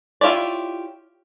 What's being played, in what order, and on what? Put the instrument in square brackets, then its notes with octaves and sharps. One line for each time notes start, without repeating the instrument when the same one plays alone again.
[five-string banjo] E4 F4 G4 C#5 D5